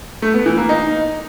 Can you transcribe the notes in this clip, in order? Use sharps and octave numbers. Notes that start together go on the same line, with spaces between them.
A3
B3
E3
A#3
D#4